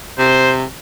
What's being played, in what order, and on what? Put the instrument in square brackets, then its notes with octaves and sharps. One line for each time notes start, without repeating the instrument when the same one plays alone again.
[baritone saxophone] C3 [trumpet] C5